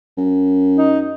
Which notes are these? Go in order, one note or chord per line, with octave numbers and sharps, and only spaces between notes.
F#2
D#4